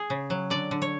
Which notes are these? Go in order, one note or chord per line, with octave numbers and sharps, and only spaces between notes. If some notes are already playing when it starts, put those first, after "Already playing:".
Already playing: G#4
C#3
F#3
D3 D5
D3
C#5